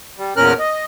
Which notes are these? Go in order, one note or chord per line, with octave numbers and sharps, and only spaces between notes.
G3
E2 A#2 C#4 A#4 F6 F#6
D#5